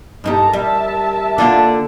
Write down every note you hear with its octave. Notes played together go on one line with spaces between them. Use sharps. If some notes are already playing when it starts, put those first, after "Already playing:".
G2 D#4 G4 A4 A5 A#5
G3 A#4 E5 A5
D3 A#3 D4 F4